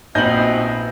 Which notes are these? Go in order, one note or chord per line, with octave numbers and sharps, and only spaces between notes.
A#1 B2 B3 C4 D#4 G6 A#6 F#7